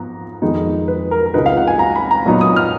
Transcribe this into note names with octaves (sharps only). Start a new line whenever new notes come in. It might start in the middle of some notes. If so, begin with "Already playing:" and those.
Already playing: G#2 F3 B3 A#5
F2 D#3 G#3 B3 D#4
B4
A#4
A#4
C#2 C#3 G#3 D#4 B4
F5
F#5
G#5
A#5
B5
A#5
A#2 F#3 B3 D#4
D#6
F6